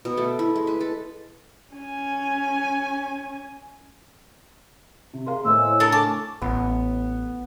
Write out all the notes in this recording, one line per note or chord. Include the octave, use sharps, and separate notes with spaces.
B2
A3
E4
G#3
B4
A4
C#4 G#5
C3
G#4 A#4 F5 C6
A2 C5 D#5 G#5 E6
E4 C#5
D4 A4 A#4 G#5 A5
A5 C#6 D6
A1 B3